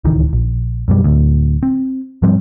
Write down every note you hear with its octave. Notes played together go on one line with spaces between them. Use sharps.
D1 C#2 D#3 E3
A#1
F#2 B2 G3
D1 D2
C4
G#2 F3 G3 C4